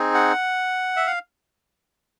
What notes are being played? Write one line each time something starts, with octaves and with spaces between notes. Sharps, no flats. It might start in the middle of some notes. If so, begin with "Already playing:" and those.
Already playing: C4 D#4 G#4
F#5
E5
F5